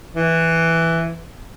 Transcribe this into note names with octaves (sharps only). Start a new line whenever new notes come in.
E3